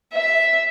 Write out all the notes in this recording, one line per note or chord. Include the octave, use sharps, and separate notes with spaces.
E5